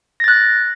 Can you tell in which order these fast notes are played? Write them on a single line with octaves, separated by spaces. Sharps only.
A#6 A6 F#6